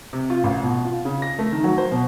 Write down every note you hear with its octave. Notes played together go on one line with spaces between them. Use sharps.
C3
F4
A1
B2
F4
C#3
A#6
A3
D#3
F#3
C5
B2